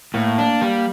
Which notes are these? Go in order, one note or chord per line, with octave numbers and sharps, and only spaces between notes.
A2 A#3
D4
G3